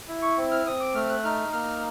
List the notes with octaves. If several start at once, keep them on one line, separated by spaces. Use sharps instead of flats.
E4
C#6
C4
F6
C4 D#6
D6
A3 F6
F#6
D#4 F6
A#3 F6